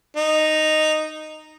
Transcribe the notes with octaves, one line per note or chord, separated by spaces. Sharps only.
D#4